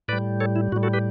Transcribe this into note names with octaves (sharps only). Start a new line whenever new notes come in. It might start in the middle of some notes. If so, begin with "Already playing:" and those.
A2 G3 B4 D5
A4 C#5
E4
A2 G3 F#4
F#4 A4
G4 B4